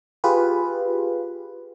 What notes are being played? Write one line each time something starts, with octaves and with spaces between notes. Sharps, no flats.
F4 G4 G#4 B4